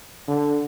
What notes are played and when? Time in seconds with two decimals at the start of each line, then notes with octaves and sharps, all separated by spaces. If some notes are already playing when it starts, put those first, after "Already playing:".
0.28 D3